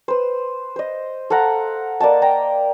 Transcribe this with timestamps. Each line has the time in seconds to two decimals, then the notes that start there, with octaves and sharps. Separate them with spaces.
0.08 B4 C5
0.76 C5 D#5
1.30 A4 F5 F#5 A#5
2.00 A#3 D5 D#5 A5
2.22 G5 A#5